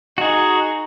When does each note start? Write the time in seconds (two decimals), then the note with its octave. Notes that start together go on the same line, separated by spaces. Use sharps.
0.18 D#4 F#4 G#4